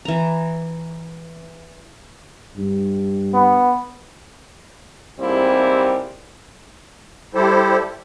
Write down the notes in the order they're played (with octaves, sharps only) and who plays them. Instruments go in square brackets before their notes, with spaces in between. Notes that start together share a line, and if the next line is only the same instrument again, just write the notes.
[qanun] E3 A#5
[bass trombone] G2
[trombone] B3
[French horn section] G#2 C3 G3 A#3 C4 E4
[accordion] G3 E4 G4 A4 C5